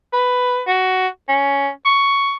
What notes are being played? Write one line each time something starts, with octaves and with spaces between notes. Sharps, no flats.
B4
F#4
C#4
C#6